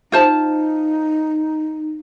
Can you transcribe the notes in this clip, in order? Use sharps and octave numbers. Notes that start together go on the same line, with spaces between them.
D#4 F4 C5 A5